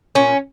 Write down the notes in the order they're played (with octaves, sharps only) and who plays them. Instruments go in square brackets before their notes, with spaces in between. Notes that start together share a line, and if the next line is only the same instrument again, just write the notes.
[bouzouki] A#2 C#4